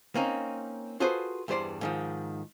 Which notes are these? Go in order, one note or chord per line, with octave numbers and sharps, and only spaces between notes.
A#3 C4 C#4 D#4
F4 F#4 G#4 A4 B4 C5
E2 G2 G3 C5 D5 C6
G#2 D#3 F3